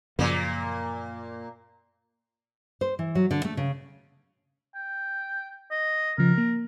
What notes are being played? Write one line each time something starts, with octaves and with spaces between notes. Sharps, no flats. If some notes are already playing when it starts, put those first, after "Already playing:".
F#2 A#2 C#3 F3 A#3
C5
E3
F#3
D3
A3
C#3
G5
D#5
C#3 F3 A#4
A#3